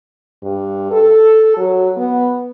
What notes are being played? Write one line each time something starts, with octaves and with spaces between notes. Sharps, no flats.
G2
A4
F#3
B3